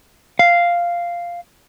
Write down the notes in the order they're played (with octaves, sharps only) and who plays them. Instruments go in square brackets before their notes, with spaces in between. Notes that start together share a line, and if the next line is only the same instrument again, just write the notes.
[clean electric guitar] F5